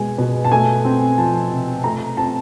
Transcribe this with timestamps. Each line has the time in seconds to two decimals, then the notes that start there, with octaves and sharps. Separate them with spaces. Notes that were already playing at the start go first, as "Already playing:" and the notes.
Already playing: B2 G#3 G#5
0.18 B2
0.45 A5
0.52 A3 G#5
0.85 C4
1.18 F3 A5
1.51 C3
1.84 A3 A#5
2.17 C4 A5